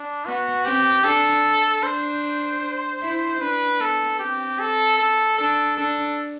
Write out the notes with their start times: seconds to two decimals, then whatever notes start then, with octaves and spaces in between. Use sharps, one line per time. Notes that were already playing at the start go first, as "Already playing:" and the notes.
Already playing: D4
0.26 B3 F#4
0.66 C4 G4
1.04 D4 A4
1.83 D4 C5
3.02 E4
3.40 D4 B4
3.80 B3 A4
4.19 C4 G4
4.60 A4
4.98 A4
5.38 D4 A4
5.77 D4 A4